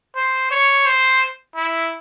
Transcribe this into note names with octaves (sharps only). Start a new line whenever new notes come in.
C5
C#5
C5
E4